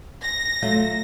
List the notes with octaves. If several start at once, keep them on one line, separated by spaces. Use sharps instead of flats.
A#6
F#3 A3 F4